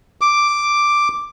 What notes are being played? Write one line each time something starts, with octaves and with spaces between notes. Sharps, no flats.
D6